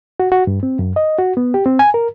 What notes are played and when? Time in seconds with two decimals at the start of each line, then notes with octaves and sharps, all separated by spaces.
0.20 F#4
0.32 F#4
0.47 G2
0.63 C4
0.79 F#2
0.96 D#5
1.18 F#4
1.37 B3
1.54 G4
1.66 C4
1.79 G#5
1.94 A#4